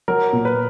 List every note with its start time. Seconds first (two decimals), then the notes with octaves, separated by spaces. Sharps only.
0.08 F#3 A#4
0.33 A#2
0.45 B4